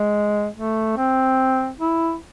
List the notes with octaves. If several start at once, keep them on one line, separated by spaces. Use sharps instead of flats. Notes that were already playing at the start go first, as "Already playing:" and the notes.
Already playing: G#3
A3
C4
E4